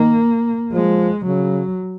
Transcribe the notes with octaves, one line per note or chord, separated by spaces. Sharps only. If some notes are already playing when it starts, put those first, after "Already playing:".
Already playing: D#3 A#3
F3 G#3
C#3 F#3